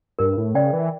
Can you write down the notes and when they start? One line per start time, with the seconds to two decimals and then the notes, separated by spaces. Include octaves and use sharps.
0.19 G2 A#4
0.37 A2
0.54 C#3 D5 G5
0.73 E3